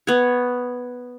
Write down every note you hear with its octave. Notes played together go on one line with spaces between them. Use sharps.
B3 C#5